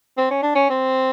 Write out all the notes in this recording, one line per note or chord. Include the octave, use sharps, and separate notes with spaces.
C4
C#4
D4
C#4
C4